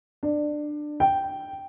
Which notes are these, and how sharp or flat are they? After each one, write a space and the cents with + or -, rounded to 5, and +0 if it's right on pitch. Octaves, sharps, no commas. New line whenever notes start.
D4 +20
G5 -5